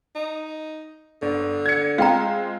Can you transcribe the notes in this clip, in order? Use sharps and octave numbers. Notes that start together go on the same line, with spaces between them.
D#4
G1 D3
G#6 C#7
G#3 C4 F4 F5 G5 A#5